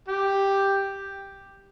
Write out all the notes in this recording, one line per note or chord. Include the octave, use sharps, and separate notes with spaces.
G4